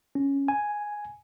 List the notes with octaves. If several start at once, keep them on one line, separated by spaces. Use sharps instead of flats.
C#4
G#5